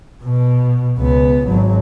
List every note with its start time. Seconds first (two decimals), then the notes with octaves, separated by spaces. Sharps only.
0.24 B2
0.98 C#2 B3
1.47 G#1 F#3